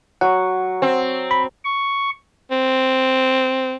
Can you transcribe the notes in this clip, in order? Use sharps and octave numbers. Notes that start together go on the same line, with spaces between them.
F#3 F#5 C#6
C4
B5
C#6
C4